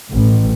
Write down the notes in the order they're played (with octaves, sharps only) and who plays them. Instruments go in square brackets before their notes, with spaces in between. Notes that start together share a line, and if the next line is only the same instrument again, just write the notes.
[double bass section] A1